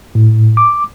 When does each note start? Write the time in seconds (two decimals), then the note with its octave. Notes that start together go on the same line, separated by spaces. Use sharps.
0.15 A2
0.57 D6